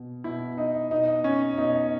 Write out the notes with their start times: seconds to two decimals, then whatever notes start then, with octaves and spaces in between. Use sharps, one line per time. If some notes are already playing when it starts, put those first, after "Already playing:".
Already playing: B2
0.24 B2 E4
0.58 D#4
0.91 B2 D#4
1.24 C#4
1.58 B2 D#4